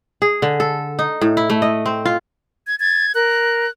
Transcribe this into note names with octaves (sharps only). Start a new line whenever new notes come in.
G#4
D3
A4
D#4
A2
E4
A3
D#5
C4
F4
G#6
G#6 A6
A#4 F#6